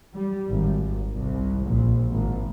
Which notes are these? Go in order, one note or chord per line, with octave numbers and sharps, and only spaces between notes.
G3
G#1
C2
A#1
G#1